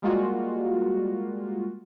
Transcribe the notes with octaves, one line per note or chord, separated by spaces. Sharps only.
G3 G#3 A#3 F4 F#4